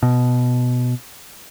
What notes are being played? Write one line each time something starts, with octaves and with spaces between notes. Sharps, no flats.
B2